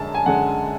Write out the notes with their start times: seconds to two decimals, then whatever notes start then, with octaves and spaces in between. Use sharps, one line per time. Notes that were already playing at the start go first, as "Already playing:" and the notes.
Already playing: F#2 D3 G#3 A5
0.15 G#5
0.26 F#2 D3 G#3 F#5